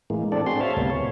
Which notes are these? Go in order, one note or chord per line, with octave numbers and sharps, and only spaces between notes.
A2 E3 G#3 A#3
C4 D4 A4 D5
C4 F#4 G#4 C6
C#5 E5 F5 A5
D2 A2 C3 G3 A#3 B3
C#5